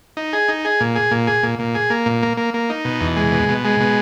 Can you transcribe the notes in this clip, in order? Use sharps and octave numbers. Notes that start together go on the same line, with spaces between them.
D#4
G#4
D#4
G#4
A#2
G#4
A#2
G#4
A#2
A#2
G#4
A#3
A#2
A#3
A#3
A#3
D#4
B2
E2
G#3
B2
B2
G#3
B2